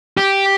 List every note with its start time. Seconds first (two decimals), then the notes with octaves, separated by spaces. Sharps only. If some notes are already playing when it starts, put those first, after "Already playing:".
0.18 G4